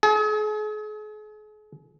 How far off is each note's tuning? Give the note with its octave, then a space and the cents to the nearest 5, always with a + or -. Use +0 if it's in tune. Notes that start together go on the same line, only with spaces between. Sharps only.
G#4 +40